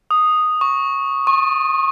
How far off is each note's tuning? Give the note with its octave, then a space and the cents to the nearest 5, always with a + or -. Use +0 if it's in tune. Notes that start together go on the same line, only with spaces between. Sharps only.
D#6 -5
C#6 +0
C#6 -35